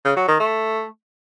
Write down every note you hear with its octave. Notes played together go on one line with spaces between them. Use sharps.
C#3
F#3
D#3
A3